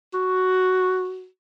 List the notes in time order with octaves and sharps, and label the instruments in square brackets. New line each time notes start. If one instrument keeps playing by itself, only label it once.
[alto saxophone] F#4